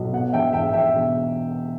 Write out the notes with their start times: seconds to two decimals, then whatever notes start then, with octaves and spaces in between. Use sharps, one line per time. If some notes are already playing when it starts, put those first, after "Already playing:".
Already playing: B1
0.13 B2 F#5
0.33 E1 E5 G5
0.53 E2 E5 G5
0.73 E1 E5 G5
0.94 B2